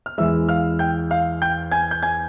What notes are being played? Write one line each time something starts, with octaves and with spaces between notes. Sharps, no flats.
F6
E2 E3 G#3 E5 E6
F5 F6
G5 G6
F5 F6
G5 G6
G#5 G#6
G6
G#5 G#6